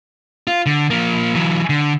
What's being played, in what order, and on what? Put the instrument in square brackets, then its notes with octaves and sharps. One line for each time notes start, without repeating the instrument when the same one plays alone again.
[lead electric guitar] F4
D3
F3 A#3
E3 F#3
D3